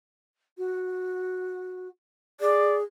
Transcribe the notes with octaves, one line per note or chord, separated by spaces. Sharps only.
F#4
G#4 D5